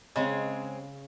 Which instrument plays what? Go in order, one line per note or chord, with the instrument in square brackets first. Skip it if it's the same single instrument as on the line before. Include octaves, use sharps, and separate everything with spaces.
[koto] C#3 [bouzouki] G#3 C4 G#4